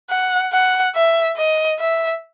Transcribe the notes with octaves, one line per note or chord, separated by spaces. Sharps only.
F#5
F#5
E5
D#5
E5